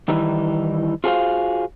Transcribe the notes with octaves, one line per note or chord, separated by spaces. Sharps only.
D#3 E3 G3 D#4 E4
F4 F#4 G#4 A4 C5 F5